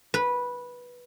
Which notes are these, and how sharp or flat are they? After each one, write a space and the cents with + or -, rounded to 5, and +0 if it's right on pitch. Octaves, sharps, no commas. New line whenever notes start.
B4 -10